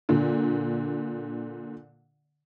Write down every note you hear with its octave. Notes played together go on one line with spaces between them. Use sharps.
A#2 D3